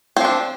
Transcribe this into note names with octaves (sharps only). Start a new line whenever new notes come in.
F3 C4 D4